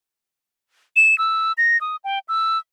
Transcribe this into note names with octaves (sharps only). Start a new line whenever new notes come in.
E7
E6
A#6
D#6
G5
E6